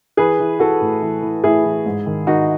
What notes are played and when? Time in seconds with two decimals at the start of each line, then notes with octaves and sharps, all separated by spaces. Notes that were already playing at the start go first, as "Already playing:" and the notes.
0.17 E3 G#4 B4
0.40 E3
0.59 E3 F#4 A4
0.81 A2
1.02 E3
1.22 E3
1.43 A2 E4 G#4
1.64 E3
1.86 G#2
2.06 D#3
2.27 D#3 D#4 F#4